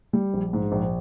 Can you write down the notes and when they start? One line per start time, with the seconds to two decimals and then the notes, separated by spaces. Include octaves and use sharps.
0.13 G3
0.34 A#1
0.53 G#2
0.72 A#1